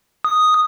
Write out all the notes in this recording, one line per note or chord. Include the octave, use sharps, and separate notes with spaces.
D#6